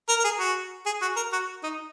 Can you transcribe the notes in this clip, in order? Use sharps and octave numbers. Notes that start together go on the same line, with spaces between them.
A#4
A#4
G#4
F#4
G#4
F#4
A#4
F#4
D#4